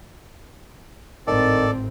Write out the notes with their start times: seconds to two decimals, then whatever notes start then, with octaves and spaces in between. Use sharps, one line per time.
1.27 G#1 A2 D#3 C4 A4 D5